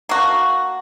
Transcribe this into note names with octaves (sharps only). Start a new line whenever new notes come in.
A#3 F#4